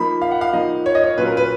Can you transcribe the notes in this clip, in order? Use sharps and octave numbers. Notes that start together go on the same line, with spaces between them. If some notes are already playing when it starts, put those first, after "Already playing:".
Already playing: F3 A#3 D#4 B5
F5
F#5
F5
F3 A#3 D#4 D#5
C#5
D#5
C#5
A#2 F#3 C#4 F4 B4
A#4
B4